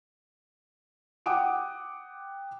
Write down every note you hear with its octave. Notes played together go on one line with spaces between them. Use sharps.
F#5 G5 D6 D#6 D7